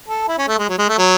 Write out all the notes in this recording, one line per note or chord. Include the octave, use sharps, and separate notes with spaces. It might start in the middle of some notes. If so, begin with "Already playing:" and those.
A4
E4
C#4
A3
G#3
F#3
G#3
A3
F#3